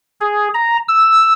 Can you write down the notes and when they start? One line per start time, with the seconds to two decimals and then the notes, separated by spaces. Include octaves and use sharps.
0.21 G#4
0.54 A#5
0.88 E6